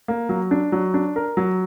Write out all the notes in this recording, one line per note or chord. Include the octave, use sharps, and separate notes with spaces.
A#3
F#3
D4
F#3
D4
A#4
F#3